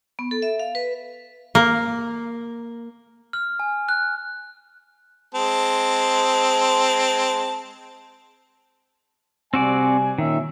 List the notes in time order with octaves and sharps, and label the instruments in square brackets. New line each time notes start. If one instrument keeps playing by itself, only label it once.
[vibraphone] B3
A4
E5
F5
B4
[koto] A#3
[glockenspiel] F6
G#5
F#6
[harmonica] G#3 C4 A5
[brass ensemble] C3 G3 G#5 [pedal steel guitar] C4 F#4 D5
[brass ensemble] A#2 C#4 E5 [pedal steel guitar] D#3